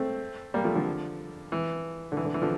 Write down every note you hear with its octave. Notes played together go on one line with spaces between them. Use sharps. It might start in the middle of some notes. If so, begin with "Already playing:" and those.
Already playing: A3 C4
G3 A#3
F3 A3
D3 F3
E3
D3
E3
D3
E3
D3 F3